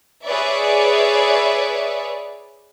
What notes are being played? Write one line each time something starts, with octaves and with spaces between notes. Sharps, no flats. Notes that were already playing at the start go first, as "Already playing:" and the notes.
G#4 B4 C#5 D5 E5